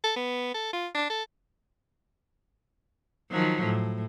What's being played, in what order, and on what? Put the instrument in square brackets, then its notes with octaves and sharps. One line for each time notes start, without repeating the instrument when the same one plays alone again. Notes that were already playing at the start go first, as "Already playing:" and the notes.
[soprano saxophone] A4
B3
A4
F4
D4
A4
[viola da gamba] D#3 F3 F#3
A2